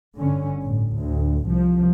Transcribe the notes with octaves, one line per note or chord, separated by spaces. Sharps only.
G1 D3 C#4
G1 A2
D2 A2
C2 F3